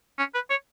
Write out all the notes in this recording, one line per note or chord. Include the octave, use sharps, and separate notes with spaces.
C#4
B4
C#5